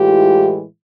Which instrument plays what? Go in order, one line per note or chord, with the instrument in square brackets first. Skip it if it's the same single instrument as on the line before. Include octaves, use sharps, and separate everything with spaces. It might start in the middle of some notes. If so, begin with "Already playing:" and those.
Already playing: [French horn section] A2 E3 G#3 F4 G4